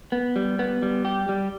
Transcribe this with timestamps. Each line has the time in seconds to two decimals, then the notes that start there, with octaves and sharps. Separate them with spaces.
0.12 B3
0.36 G3
0.59 B3
0.82 G3
1.05 G4
1.29 G3